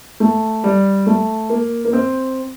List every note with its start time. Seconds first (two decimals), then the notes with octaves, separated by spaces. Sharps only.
0.20 A3
0.64 G3
1.06 A3
1.50 A#3
1.85 A#3
1.93 C4